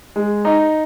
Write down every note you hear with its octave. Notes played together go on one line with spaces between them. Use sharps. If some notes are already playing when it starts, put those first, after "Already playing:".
G#3
D#4